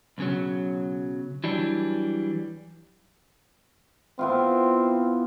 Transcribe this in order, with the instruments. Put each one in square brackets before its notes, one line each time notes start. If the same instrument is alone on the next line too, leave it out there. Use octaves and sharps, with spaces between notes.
[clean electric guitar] B1 C#3 F#3
E3 F#3 G3 D4
[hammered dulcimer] B3 E4 F4 [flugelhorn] C4